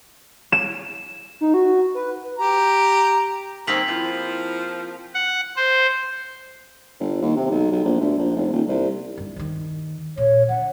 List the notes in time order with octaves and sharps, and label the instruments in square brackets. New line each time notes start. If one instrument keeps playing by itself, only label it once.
[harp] E7
[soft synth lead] D#4
F#4
B4
[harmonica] G4 A#5
[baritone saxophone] D#2 [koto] A#3 C4 G#4 [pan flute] C5 [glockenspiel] B6 F7 F#7
[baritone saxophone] F3 [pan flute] E4 [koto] F4
[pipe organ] F#5
C5
[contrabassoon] G1
D#2
C3
B1
B1
A#1
D2
A#1
F1
D#1
C2
[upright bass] G1
D#2 D#3
[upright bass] A#2 [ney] C#5
[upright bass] D3 [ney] F#5